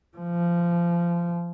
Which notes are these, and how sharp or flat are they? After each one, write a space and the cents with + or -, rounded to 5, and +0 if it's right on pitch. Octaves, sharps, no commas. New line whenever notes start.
F3 -20